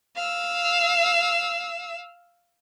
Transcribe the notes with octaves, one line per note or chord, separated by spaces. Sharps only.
F5 E6